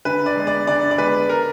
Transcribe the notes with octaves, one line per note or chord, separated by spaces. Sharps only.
D3 B4
D5
G#3 B3
D5
D3 D5
D5
G#3 B3 B4
A#4